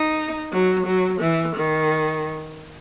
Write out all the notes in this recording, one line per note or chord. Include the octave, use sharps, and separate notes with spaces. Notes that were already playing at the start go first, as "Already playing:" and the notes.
Already playing: D#4
F#3
F#3
E3
D#3